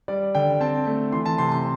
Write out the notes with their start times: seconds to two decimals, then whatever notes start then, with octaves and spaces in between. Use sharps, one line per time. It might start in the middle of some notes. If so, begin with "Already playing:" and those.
0.08 G3 D5
0.35 D3 G5
0.60 C4 A5
0.87 A3
1.12 E3 C6
1.26 A5
1.38 C3 C6
1.52 C6